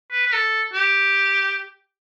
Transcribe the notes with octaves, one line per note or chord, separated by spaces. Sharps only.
B4
B4
A4
G4